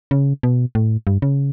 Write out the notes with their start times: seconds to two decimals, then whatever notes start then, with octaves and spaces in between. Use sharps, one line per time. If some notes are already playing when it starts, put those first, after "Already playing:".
0.11 C#3
0.43 B2
0.75 A2
1.07 G2
1.22 C#3